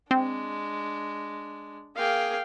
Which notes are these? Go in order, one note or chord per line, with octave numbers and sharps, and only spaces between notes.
G#3 C4 D4
A#3 G#4 F5 G5